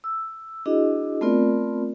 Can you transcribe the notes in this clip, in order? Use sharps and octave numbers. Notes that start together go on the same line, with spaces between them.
E6
D4 E4 F#4 G#4 D#5
A3 B3 C4 F4 A#4 D5